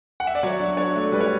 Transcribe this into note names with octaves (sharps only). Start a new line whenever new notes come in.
F#5
E5
D5
F#3 C#5
D4
D4 C#5
A3
G3 B4
C#5